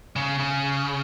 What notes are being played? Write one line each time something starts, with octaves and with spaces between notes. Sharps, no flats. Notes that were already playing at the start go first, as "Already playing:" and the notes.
C#3
C#3